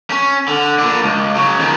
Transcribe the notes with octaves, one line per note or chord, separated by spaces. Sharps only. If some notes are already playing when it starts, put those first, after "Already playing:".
C#4
D3
A#2 D4
C#2
C#3 F#3
D#3 F3